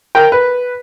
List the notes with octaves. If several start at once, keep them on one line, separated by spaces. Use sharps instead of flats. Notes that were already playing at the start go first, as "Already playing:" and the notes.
A#4 G5
B4